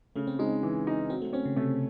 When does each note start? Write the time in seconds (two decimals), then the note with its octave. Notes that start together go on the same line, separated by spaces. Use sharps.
0.16 C#3 A3
0.27 C4
0.39 G#3 D#4
0.63 E3
0.87 D#4
1.10 F#3 C4
1.22 A3
1.33 C4 C#4
1.46 C#3
1.57 C3 A3